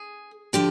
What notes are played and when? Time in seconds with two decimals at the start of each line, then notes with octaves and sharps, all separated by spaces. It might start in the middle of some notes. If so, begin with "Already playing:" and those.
Already playing: G#4
0.53 D3 F3 G4